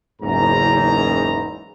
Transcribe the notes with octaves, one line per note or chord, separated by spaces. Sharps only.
F#1 E2 G#2 A#5